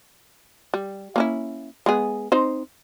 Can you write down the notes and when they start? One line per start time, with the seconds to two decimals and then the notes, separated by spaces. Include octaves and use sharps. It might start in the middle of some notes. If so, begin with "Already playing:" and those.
0.74 G3
1.16 A#3 C#4 E4
1.86 G#3 B3 G#4
2.32 C4 D#4 C5